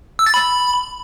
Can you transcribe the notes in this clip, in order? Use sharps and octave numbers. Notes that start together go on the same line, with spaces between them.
E6
A6
B5